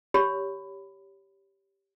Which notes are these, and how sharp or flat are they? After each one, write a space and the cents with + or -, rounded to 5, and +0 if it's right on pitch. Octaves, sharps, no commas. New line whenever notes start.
G4 +0 C#5 +15 B5 +15